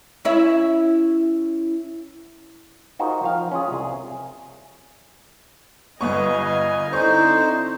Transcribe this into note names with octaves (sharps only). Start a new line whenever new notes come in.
C#4 E4 E5
D#4 F4 F#4 G#4 A#4 C5
F3 F5 G5
C#4 F4 G#4
C2 G#4
G1 B3 D#5 F5 G#5 C#6
D3 C4 D#4 E4 C5 C#6